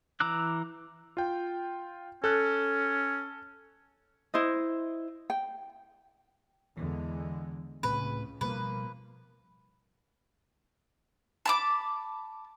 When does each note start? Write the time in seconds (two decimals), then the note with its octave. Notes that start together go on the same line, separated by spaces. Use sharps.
0.20 E3 A#5 D6 E6 F#6
1.17 F4 G5
2.24 C#4 A4 F#6
4.34 E4 C5 D#5
5.30 G5
6.77 E2 D3 E3 G#3
7.83 C#2 A2 C#3 A3 C4 B4
8.41 B2 F3 G3 A#3 B4
11.46 A5 B5 D6